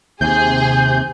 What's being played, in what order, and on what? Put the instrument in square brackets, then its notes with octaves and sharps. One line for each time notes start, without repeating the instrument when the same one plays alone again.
[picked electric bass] D#2 [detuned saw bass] C3 [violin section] G#4 [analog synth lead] G6